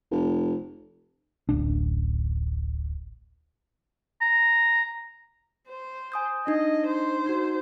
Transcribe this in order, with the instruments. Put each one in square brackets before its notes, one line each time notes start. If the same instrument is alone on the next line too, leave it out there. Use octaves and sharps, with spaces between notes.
[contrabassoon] F1
[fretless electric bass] D1 A1 D4
[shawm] A#5
[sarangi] C5
[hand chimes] G#5 D#6 G6
[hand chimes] D4 D#4 [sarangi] D#5
[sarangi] C5
[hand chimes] D#4 F#4